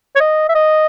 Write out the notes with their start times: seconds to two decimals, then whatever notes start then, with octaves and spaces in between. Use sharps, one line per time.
0.16 C#5
0.21 D#5
0.49 E5
0.55 D#5